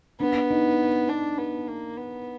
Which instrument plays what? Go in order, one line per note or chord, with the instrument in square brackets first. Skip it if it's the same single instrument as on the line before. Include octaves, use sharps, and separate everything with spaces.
[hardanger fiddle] B3 [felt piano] D4
[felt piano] D#4
[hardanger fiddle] D4
B3
A#3
B3